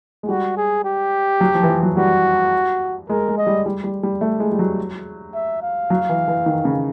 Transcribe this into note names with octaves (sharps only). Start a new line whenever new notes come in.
G#3
G3 F#4
G#4
G4
F#3
F3
E3
F3
F#3
G3 F#4
G#3 A#4
G#3
D#5
G3
G3
G3
G3
A3
G#3
G3
F#3
E5
F5
F#3
E3
E3
D#3
C#3